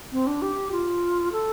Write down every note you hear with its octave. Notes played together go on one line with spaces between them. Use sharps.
C4
D4
G4
F4
A4